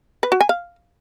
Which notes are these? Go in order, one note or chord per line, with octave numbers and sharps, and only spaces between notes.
B4
F#4
G#5
F5